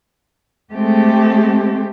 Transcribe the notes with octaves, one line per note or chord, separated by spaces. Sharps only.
G#3 A3 C4 G4